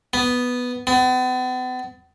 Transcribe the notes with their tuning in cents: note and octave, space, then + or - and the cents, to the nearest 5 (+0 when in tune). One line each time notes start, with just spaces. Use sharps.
B3 +0
B3 +40